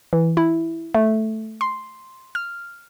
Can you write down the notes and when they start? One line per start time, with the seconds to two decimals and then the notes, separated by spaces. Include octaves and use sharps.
0.13 E3
0.37 E4
0.94 A3
1.61 C6
2.35 F6